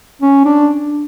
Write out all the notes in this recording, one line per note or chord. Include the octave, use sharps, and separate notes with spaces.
C#4
D4